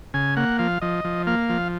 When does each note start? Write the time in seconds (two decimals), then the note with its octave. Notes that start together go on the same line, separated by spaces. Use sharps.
0.14 C#3 G#5
0.37 A#3 F#5
0.59 F3 F5
0.82 F3 D#5
1.04 F3
1.27 A#3 F5
1.50 F3